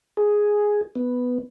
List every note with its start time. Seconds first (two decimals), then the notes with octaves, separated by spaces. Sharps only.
0.17 G#4
0.95 B3